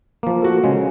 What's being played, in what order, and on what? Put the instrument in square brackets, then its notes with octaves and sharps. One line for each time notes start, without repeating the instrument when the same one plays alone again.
[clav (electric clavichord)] F3 A#3
[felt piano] A3 F#4
[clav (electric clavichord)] C#3 G#3